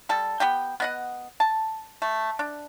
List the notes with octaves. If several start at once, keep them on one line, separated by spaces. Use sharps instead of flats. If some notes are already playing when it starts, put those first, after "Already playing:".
G3 A4
B3 G4 G5
B3 D#5 F#5
A5
A3
D4